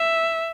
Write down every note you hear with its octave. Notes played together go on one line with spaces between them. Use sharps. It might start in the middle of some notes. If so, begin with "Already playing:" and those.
Already playing: E5